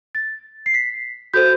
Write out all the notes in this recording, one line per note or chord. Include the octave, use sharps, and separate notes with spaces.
A6
C7
B6
F#4 A4 C5 G6